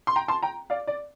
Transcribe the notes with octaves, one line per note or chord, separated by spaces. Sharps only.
C6
G5 A#5
A5 C6
G5 A#5
D5 F5
D5